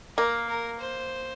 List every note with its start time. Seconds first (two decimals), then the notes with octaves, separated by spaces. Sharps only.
0.17 A#3 A#4
0.48 A#4
0.79 C5